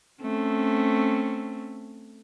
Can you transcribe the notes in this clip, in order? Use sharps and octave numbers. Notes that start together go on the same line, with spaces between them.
A3 C4 C#4